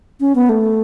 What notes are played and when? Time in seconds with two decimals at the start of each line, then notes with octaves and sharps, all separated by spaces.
0.20 C#4
0.35 B3
0.49 A3